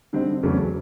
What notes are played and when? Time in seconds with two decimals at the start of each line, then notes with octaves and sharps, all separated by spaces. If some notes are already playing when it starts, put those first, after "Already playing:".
0.13 D3 G3 C4 D#4
0.43 E2 C#3 F#3 A3 C#4